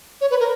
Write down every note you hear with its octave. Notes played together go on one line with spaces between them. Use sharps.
C#5
B4
A#4